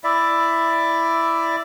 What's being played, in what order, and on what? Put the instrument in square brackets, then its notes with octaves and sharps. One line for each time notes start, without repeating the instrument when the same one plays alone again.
[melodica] E4 D5 E5